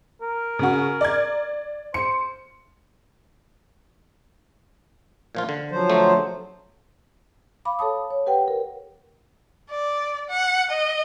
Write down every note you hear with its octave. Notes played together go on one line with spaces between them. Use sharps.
A#4
C#3 F#4
D5 G#6
C5 C#7
A#2 F3 F4
D3
F3 F#3 C5
D3 A3
F5 B5 D6
A4 C#5 A5 D#6
C#5
G4 B4 F#5 G5
A#4
D5
F#5
D#5